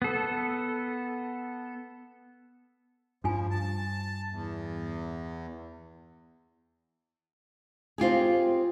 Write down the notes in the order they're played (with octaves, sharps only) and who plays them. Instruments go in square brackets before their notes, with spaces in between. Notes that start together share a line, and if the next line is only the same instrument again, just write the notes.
[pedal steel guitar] B3 A4
[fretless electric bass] G2 [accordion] F3 [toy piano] D4 F4 G#5
[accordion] A5
E2
[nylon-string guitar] C4 F4 G4 G#4